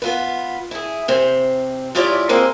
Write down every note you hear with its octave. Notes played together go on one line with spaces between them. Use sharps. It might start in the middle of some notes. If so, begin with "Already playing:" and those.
B3 F4 B4
E4 G#4
C3 C4
G#2 E4 F4 G4 C#5 D5
G#3 A#3 C4 C5